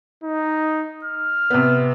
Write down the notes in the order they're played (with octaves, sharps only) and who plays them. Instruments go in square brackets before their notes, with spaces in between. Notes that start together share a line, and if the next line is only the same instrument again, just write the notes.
[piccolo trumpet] D#4
F6
[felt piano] C3 B3